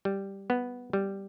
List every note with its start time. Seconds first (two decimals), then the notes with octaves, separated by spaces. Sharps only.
0.05 G3
0.50 B3
0.93 G3